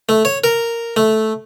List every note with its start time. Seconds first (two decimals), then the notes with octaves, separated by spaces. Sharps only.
0.09 A3
0.25 C#5
0.44 A#4
0.97 A3